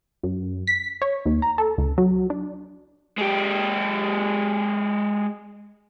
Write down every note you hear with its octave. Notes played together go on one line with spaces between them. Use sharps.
F#2
B6
C#5
D#2
A#5
A4
C#2
F#3
D4
G#3 G4